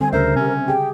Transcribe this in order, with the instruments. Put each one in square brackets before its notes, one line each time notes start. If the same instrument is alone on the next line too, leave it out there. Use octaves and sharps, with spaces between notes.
[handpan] D3 G3 [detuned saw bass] C4 [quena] G#5
[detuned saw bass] D2 [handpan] C#3 E5 [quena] A#4 [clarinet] C5
[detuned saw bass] C3 [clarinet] C#4
[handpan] G4 G#4 [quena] G5